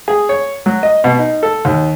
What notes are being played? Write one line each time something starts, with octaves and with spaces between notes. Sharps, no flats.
G#4
C#5
F#3
D#5
B2
D#4
A4
D#2